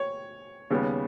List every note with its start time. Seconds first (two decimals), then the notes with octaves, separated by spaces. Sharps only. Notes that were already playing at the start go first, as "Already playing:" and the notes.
Already playing: C#5
0.70 D#2 C#3 G3 B3